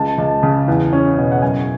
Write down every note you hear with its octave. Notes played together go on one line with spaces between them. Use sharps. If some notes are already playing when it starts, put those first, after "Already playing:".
Already playing: C#2 A5
C#2
C#3
E2
C#4
B2
F#5
F#2 G#5